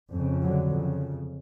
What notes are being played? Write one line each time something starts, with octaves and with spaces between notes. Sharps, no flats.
F2 C#3
D3 F#3
F2 C#3